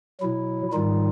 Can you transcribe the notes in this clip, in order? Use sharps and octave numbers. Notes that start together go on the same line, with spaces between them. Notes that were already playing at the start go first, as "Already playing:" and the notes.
B2 F#3 E4
G#2 D#3 G3 D#4 F4